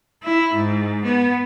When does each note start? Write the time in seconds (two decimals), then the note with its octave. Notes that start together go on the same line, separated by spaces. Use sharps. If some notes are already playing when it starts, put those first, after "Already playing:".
0.23 E4
0.55 G#2
1.06 B3